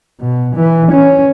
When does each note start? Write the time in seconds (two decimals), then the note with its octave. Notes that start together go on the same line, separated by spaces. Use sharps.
0.20 B2
0.55 E3
0.91 C#4